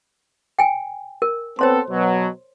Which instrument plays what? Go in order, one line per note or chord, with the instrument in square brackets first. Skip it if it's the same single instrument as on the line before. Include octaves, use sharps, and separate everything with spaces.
[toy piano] G5 G#5
A#4
[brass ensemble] B3 C4 A4 [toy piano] C5 C#5 C6
[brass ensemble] B2 F#3